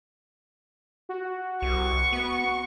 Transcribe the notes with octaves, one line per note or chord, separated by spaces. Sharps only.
F#4
C2 C#6
B3